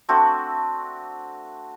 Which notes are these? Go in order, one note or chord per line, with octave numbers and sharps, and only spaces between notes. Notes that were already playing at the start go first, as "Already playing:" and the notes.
A3 C4 D4 F#4